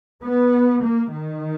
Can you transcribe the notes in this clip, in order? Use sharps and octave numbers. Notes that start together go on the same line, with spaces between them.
B3
A#3
D#3